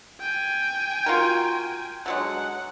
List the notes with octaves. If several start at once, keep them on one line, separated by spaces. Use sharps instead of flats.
G5 G#5
F4 F#4 A#4
D3 F#3 G#3 F#5